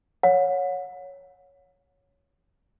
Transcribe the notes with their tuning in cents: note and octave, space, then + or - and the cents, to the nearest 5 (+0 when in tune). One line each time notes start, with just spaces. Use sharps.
C#5 +0 F#5 -35